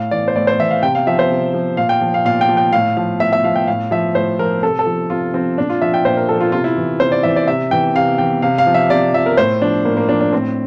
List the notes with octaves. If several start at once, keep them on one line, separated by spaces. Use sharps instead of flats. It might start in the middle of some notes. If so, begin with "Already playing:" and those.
Already playing: A2 F5
E3 D5
C5
A2 D5
C5
E3 E5
F5
C3 G5
F5
F3 E5
C5
C3
F3
A#2 F5
G5
F3
F5
A#2 F5
G5
F3
G5
A2 F5
F3 F5
A2 E5
E5
F3 F5
G5
A2 F5
F3 E5
A2 C5
F3 A#4
C3 A4
A4
F3
C3 F4
F3 C4
A#2 D4
F4
F3 E5
G5
A#2 C5
A#4
F3 A4
F4
C3 F4
E4
E3
C3 C5
D5
E3 E5
D5
C3 E5
E3 G5
C3 F5
E3 G5
C3 F5
F5
F3
E5
C3 D5
F3 E5
A#4
A2 C5
F3 D4
A2 A#3
A#3
F3 D4
D4
A2 C4